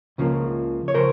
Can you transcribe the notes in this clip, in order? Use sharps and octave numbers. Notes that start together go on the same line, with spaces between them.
C#2 C#3 F3 A#3
C#5
C#3 F3 A#4 C5